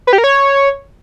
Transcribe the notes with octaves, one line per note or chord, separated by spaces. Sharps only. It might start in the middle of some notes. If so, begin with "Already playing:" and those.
B4
G4
A#4
C#5